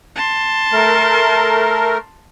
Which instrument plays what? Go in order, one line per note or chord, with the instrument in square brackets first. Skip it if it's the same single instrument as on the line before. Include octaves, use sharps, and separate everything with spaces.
[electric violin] A5 C6
[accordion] A3 A#4